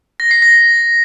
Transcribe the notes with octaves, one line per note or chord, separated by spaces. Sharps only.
A#6
C7
A#6